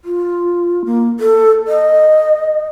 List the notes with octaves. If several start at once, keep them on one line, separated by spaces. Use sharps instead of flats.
F4
A#3
A4
D#5